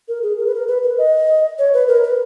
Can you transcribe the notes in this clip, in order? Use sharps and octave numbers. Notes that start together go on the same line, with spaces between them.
A#4
G#4
A#4
B4
A#4
B4
B4
D#5
C#5
B4
A#4
B4